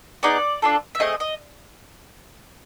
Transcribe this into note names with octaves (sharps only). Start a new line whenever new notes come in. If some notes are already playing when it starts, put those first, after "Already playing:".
B3 D#4 G#4 D5
D4 F4 A4
E5
A3 C4 G#4 D#5
D#5